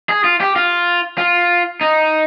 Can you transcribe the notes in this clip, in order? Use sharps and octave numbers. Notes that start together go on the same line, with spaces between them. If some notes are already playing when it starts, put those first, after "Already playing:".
G#4
F4
G4
F4
F4
D#4